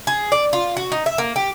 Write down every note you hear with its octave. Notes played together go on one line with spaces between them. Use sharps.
G#4
D5
F4
F#4
D#4
E5
A#3
G4